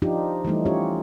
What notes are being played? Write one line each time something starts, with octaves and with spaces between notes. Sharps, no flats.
F3 D4 D#4 F4 G4
E3 G3 A3 D#4
C#4 F4 G4 C#5